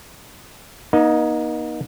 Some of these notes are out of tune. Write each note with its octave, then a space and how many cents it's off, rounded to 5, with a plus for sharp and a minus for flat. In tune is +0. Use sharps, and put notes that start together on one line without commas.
A#3 +45 D#4 +0